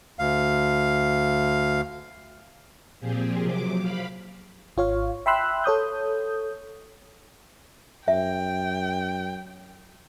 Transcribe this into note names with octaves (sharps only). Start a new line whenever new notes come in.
D2 F5
A#2 F3 C4 G4 G#4
C3 F#3 D6
F5 B5
G#1 F4 C#5 F5
E5 G5 B5 C6 E6 F#6
A4 C#5 D#6 G6
F#2 E5 G5